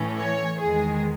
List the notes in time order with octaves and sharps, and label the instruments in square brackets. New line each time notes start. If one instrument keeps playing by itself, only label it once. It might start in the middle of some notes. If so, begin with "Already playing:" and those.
Already playing: [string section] A2 E3 A3 C#4
C#5
E2 D#3 G#3 G#4